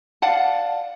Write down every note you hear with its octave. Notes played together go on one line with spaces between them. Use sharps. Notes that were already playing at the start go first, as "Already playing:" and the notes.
D5 F5 F#5 A5